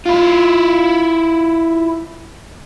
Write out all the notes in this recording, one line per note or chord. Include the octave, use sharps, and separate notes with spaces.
E4 F4